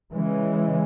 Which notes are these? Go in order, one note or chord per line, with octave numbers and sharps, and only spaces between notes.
C#3 E3 G#3